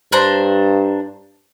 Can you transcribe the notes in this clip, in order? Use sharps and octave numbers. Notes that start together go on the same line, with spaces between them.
G2 D4 C5 A#5